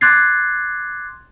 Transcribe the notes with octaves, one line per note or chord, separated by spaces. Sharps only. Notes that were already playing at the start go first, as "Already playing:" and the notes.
C6 D6 F#6 G#6 A6 C7